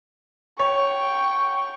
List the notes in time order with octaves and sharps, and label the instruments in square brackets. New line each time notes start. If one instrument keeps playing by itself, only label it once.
[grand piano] C#5 [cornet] G5 [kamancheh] C#6